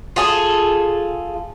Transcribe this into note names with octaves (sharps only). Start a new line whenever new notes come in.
F4 G#4 A4